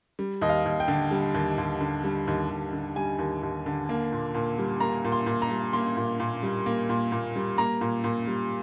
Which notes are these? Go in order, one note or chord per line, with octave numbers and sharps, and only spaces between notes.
G3
D#2 D#5
F5
D#2
G5
D3
G3
D#2
D#2
D3
G3
D#2
D#2
D3
G3 G#5
D#2
D#2
D3
A#3
A#2
A#2
G3
A#3 A#5
A#2
C6
A#2
A#5
G3
A#3 C6
A#2
A#2
G3
A#3
A#2
A#2
G3
A#3 A#5
A#2
A#2
G3